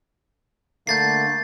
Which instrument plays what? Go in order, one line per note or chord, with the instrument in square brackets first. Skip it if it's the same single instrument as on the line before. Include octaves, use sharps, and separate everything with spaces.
[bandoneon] D3 A3 A#3 [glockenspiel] G6 A6 C7